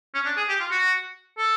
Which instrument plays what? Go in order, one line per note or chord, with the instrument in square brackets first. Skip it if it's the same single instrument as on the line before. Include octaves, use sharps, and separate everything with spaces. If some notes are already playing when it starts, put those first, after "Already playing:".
[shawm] C#4
D4
G#4
G4
F4
F#4
A4